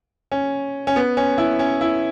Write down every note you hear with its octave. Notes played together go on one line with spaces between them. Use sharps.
C#4
C#4
B3
C#4
E4
C#4
E4